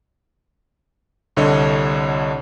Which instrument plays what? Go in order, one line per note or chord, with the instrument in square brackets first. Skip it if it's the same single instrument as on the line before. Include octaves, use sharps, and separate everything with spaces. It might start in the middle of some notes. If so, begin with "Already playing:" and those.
[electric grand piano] C2 D3 C#5 D#5